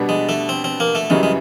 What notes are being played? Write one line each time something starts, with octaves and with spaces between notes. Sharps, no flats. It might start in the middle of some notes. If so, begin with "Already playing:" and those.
Already playing: B2 G3 B3 D4
G#3
A3
C4
C4
A#3
A3
F#2 C#3 E3 G3 G#3
G#3